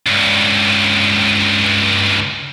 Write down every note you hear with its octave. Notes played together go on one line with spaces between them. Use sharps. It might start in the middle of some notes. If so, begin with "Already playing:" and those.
C#2 G2